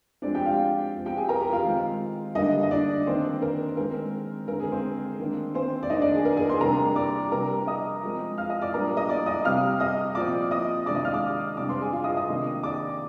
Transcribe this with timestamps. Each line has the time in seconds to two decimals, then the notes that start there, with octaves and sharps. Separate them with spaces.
0.22 F3 G#3 C4 D4 D5
0.35 G4 G5
0.46 F4 F5
0.94 F3 C4
1.06 G4 G5
1.17 G#4 G#5
1.29 A#4 A#5
1.41 G4 G5
1.52 F4 F5
1.64 D#3 G#3 C4
2.35 D3 G3 A#3 D4 D#4 D#5
2.63 D#5
2.71 D4 D5
3.07 D#3 A#3 C4 D4 C5
3.42 A#4
3.77 D#3 G#3 C4 A#4
4.48 D3 G#3 C4 A#4
4.60 G#4
4.72 C4 C5
5.19 D#3 A#3 D4
5.54 C4 C5
5.83 D5
5.90 D#3 A#3 D4 D#4 D#5
6.02 D4 D5
6.14 G#4
6.25 A#4
6.37 G#4 G#5
6.49 C5 C6
6.60 C3 G3 A#3 D4 A#4 A#5
6.96 D5 D6
7.32 C3 G3 D4 A#4 A#5
7.67 D#5 D#6
8.03 F3 G#3 C4
8.38 F5 F6
8.49 D#5 D#6
8.62 D5 D6
8.74 A#2 G3 D4 A#4 A#5
8.97 D#5 D#6
9.09 D5 D6
9.26 D#5 D#6
9.44 C3 G3 C4 F5 F6
9.80 D#5 D#6
10.15 A#2 F3 C4 D5 D6
10.51 D#5 D#6
10.86 C3 D#3 G#3 D4 D5 D6
10.95 D#5 D#6
11.04 F5 F6
11.13 D5 D6
11.57 C3 G3 D4 D5 D6
11.69 C5 C6
11.81 G#4 G#5
11.93 F4 F5
12.04 D#5 D#6
12.17 D#5 D#6
12.29 C3 D#3 A#3 D4
12.63 D5 D6